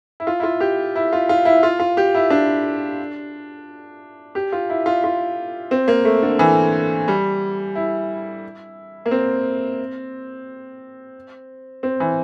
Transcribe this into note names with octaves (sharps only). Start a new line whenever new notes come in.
E4
F4
E4
F4
G4
E4
F4
F4
E4
F4
F4
G4
E4
D4
G4
F4
E4
F4
F4
C4
A#3
A3
D3
E3
G3
E4
A#3
C4
C4
E3